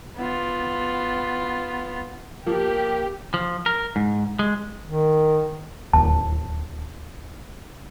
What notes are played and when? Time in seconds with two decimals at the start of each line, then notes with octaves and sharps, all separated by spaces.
0.17 B3 F4
2.46 F3 A#3 G4
3.34 F3
3.66 A#4
3.96 G#2
4.39 G#3
4.86 D#3
5.93 D1 G#1 D#2 A5